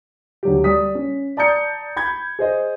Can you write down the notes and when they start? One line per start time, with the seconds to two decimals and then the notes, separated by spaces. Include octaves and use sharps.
0.43 D2 F#3 G4
0.64 G3 D#6 B6
0.95 C#4
1.37 D5 A5 A#5 D#6 G6 C#7
1.96 B5 G6 G#6
2.39 G#4 C5 D#5